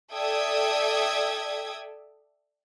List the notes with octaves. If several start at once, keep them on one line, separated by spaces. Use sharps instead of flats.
A4 D5 E5 G5 D#6 G#6